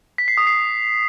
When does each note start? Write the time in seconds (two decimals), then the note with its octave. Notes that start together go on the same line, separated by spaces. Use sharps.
0.18 B6
0.28 C7
0.37 D#6
0.47 C7